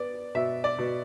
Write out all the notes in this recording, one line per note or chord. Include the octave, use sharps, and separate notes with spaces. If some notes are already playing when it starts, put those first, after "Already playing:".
Already playing: B3 D5
B2 E5
D5
B2